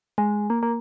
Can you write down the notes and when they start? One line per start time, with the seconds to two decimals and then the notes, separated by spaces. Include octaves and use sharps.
0.18 G#3
0.50 A#3
0.63 A#3